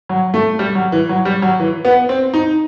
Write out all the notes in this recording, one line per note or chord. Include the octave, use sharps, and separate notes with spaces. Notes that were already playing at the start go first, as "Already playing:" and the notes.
F#3
A3
G3
F#3
E3
F#3
G3
F#3
E3
B3
C4
D#4